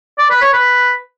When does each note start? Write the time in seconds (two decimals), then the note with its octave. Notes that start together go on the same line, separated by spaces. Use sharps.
0.18 D5
0.30 B4
0.42 C#5
0.53 B4